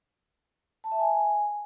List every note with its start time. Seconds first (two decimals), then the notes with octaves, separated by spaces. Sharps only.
0.84 A5
0.92 E5
0.99 G#5